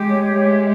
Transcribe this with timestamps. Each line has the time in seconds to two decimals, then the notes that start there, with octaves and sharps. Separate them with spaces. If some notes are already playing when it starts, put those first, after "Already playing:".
Already playing: G#3 G4
0.08 C#5
0.35 G#3 E5